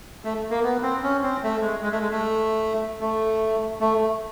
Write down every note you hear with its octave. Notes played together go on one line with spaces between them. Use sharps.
A3
A#3
B3
C4
C#4
C4
A3
G#3
G#3
A3
G#3
A3
A3
A3